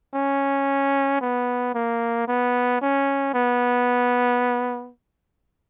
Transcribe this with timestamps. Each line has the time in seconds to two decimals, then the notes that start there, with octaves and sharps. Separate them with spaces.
0.14 C#4
1.21 B3
1.75 A#3
2.28 B3
2.81 C#4
3.34 B3